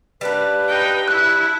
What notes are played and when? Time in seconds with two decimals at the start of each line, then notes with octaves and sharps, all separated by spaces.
0.21 G3 A#3 D4 B4
0.68 D#4 G5
1.08 E4 F#6